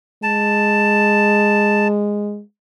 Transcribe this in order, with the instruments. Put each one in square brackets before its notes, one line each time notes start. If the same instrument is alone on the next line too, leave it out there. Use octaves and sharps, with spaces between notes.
[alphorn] G#3 [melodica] A5